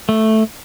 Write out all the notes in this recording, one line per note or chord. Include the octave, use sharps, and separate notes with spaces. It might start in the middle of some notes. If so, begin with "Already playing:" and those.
A3